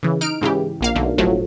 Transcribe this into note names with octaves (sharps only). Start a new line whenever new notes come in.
C#3 E3
D#4 F6 D7
G#2 C#3 E3 G4
A#1 A#3 F5
B1 D3 A3 A#3
G1 A2 F3 F#3 A3